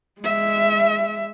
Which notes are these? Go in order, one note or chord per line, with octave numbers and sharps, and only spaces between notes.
G#3 E5